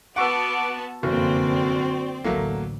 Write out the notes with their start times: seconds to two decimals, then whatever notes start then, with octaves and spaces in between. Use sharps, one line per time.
0.16 B3 F#4 F#5 A5 C#6 D6 E6
1.03 F1 F#2 D3 A#3 C4 F#4 D5
2.24 A1 D2 F#3 A3 A#3